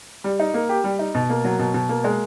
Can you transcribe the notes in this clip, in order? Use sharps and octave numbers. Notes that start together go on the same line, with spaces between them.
G3
D#4
A#3
G4
G3
D#4
B2
A#3
F#3
B2
B2
A#3
G#3